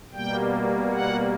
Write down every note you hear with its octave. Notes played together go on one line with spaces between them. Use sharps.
B2 G3 A#3 G5
F#5